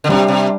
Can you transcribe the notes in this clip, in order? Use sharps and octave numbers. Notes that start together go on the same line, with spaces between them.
D3
C3 G3 D4 G4
C3